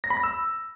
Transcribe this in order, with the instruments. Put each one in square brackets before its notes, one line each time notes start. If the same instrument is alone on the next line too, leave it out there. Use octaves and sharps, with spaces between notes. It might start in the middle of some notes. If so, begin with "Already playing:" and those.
[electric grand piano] A#6
B5
A#6
E6